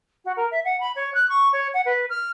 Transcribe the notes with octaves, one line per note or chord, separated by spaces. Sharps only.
F#4
A#4
E5
F#5
B5
C#5
F#6
C#6
C#5
F#5
B4
F6